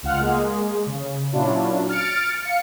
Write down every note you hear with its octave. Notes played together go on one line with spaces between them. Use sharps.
C#2 F4 F#5 F6
G#3 A#3 G#4
C#3
A#2 F#3 C#4 D4 E4 F4
F6 A6 C#7 D7
F5 C#7